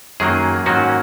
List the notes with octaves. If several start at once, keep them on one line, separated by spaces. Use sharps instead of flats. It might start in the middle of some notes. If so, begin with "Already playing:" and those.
F#2 D#3 F#3 A#3 G#4
G#2 D#3 F#3 A#3 C#4 F#4